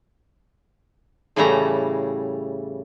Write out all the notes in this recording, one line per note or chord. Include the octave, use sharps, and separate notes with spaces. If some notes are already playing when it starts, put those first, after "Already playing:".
A2 C#3 E3 G3 A3 A#5